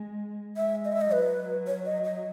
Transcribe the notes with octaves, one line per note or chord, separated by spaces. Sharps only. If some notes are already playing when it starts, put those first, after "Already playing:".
Already playing: G#3
G#3 E5
D#5
E5
D#5
F#3 B4
C#5
D#5
D#5